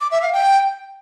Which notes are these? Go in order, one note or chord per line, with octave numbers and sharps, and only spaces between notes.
D6
E5
F5
G5